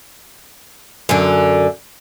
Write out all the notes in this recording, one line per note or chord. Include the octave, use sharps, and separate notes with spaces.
F#2 D3